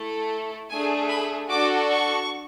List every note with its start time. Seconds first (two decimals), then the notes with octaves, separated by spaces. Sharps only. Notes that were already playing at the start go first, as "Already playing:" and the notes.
Already playing: A3 E4 A4
0.70 A3 D4 G#4 G#5
1.10 B5
1.50 D4 F#4 A4 D6
1.90 C#6